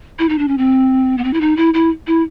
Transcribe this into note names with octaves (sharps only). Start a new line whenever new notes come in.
E4
D#4
D4
C#4
C4
B3
C4
E4
D#4
E4
E4
E4